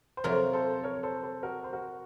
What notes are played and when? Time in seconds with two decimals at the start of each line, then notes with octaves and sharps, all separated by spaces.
0.17 C5
0.24 F2 C3 F#3 A#3 F4 A#4 C#5
0.53 A4 C5
0.83 A#4 C#5
0.95 C#5
1.03 A4 C5
1.23 A4 C5
1.43 F#4 A#4
1.64 C5
1.73 F#4 A#4